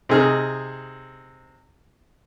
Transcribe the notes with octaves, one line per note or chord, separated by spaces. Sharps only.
C3 D#4 G#4 F6